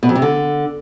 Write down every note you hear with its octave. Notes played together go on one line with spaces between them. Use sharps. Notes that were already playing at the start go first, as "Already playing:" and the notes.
B2
F2
C3
D3